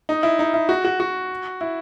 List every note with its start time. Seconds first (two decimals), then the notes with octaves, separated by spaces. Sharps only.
0.09 D#4
0.23 E4
0.39 D#4
0.54 E4
0.69 F#4
0.85 F#4
1.00 F#4
1.61 E4